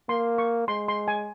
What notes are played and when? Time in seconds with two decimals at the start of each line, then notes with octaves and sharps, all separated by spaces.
0.09 A#3 C6
0.38 C#6
0.68 G#3 C6
0.88 C6
1.08 G#5